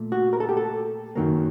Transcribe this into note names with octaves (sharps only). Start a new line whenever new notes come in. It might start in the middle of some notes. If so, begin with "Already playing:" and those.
Already playing: A#2 A3
F#4
A#4
A4
G4
A4
F#2 D#3 F#3 A#3